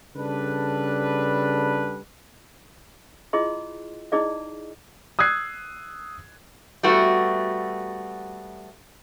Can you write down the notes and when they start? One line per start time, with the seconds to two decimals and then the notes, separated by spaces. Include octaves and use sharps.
0.16 C#3 G3 D4 A4 B4
3.33 E4 F4 G#4 D#5 C6
4.12 D#4 E4 G#4 D5 D#5
5.19 D#6 E6 F#6 G#6 C7
6.83 G3 A3 B3 F#4